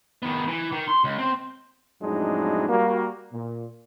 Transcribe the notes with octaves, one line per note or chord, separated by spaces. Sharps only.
D#3 B3
E3
D#3
C6
C#2
C4
F2 A2 F#3 G#3 D4 D#4
G3 A#3 F#4
A#2